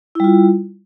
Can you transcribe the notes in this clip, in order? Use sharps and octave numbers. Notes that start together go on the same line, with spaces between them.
G3 E4 F4